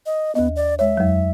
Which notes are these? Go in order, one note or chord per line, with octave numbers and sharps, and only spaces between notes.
D#5
D#2 B3 D#5
D5
G#3 C#5 E5
F2 F#3